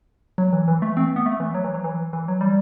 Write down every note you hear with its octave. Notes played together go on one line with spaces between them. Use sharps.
F#3
E3
E3
A3
C4
B3
A3
E3
F#3
E3
F#3
E3
E3
F#3
G3